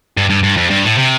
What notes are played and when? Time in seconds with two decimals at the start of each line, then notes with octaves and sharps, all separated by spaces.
0.18 G2
0.30 G2
0.43 G2
0.57 F2
0.70 G2
0.84 A2
0.98 C3